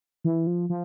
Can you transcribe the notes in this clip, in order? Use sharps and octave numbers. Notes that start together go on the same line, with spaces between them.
E3
F3
F3